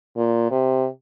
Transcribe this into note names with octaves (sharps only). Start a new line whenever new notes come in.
A#2
C3